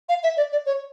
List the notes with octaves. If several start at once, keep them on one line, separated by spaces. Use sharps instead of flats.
F5
E5
D5
D5
C#5